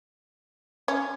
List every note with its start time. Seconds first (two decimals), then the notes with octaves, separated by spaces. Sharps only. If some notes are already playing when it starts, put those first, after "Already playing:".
0.88 C#4